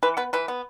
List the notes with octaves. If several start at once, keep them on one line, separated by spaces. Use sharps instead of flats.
E3 B4
B3 B4
E3 B4
B3